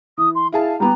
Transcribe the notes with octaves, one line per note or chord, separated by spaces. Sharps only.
E3 D#6
C6
E4 G#4 F5 A5
G3 B3 G4 A#5